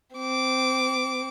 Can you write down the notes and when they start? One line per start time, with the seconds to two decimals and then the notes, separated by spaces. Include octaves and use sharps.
0.16 C4 D6